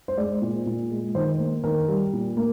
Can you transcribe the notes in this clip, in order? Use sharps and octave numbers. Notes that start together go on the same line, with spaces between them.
C5
G#3 D5
A#2
A#2
G#3
D#3 C5
A#3
D#3 A#4
G3
A#2
A#3